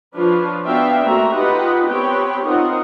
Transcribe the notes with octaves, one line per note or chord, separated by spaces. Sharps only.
F3 D4 F4 B4 C#5
B3 D4 F#4 E5 F5 G5
A3 A#3 C4 F#4 E5 A#5
D#4 F4 G4 B4 D#5 F#5
B3 C4 G4 B4 C#5 G5
C4 D#4 F4 A#4 F#5